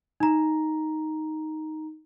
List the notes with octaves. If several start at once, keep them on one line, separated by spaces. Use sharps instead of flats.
D#4 A#5